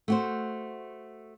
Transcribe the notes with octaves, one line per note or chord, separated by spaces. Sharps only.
A3 F#4 C5